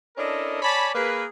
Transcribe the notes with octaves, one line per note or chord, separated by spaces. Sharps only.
C#4 D4 E4 A4 A#4 D#5
C#5 D5 G#5 A5 B5
A#3 G#4 A#4 B4